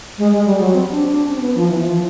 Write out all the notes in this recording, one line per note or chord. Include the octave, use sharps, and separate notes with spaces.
G#3
G#3
G3
F#3
C4
D4
D4
C#4
C4
B3
F3
E3
F3